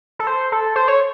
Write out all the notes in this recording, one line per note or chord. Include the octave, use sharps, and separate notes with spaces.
A4
C5
A4
C5
C#5